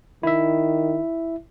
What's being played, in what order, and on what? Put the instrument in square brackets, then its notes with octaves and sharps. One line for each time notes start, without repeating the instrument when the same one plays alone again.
[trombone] D#3 [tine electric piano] E4 E5